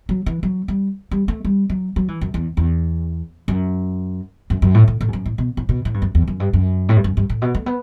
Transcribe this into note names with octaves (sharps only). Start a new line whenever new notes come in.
F#3
E3
F#3
G3
G3
A3
G3
F#3
F#3
E3
F#2
E2
E2
F#2
F#2
F#2
A2
A2
A2
E2
F#2
A2
B2
A2
B2
A2
G2
F#2
E2
F#2
G2
F#2
A2
G2
F#2
G2
A2
B2
A3
B3